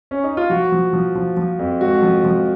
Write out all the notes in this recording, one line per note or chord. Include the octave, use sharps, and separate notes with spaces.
C#4
D#4
F4
F3 F#4
F3
F3
F3
F3
F2
G#2 F#4
F3
F3